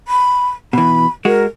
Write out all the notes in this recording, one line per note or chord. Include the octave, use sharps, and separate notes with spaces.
B5
B2 E3 B5
G#3 F#4 A#4